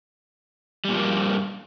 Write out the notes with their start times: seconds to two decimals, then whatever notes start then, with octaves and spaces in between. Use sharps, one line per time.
0.85 G3
0.89 A#2
0.93 F3
0.97 A#3
1.01 G2